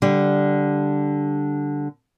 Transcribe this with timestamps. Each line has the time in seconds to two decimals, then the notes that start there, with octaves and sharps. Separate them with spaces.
0.02 D3 G3